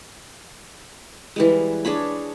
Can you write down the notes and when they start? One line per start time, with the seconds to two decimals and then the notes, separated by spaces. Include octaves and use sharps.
1.36 E3 G3 G#3
1.85 D4 G#4 C#5 B5